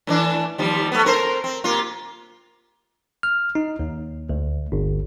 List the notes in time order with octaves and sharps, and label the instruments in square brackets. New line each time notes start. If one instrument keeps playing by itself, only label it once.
[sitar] A2 E3 D4
D#2 F3 G3
A3 B3
C4 A#4 C5
C4
C3 A#3 F4
[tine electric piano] F6
D#4
D#2
D2
G1